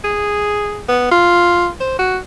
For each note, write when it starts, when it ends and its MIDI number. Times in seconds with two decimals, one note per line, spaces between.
0.04 0.83 68
0.88 1.08 59
1.11 1.69 65
1.81 1.96 72
1.99 2.18 66